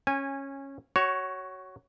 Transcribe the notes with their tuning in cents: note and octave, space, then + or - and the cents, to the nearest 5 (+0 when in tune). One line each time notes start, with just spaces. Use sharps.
C#4 -15 G#5 -20
F#4 +20 C#5 +0